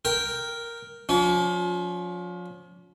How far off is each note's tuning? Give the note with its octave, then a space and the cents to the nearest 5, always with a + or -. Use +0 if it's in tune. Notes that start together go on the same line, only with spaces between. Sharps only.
A#4 +0 G5 +0
F3 +30 C#4 +45